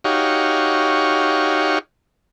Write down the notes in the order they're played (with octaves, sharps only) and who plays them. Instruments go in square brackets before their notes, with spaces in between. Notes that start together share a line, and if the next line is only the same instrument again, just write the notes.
[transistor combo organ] D#4 F#4 G4 C#5 F5